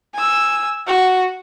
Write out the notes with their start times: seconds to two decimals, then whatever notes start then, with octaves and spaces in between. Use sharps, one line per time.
0.14 G#5 E6
0.87 F#4